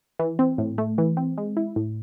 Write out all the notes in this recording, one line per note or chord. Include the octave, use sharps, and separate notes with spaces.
E3
C4
A2
A3
E3
C4
G#3
E4
A2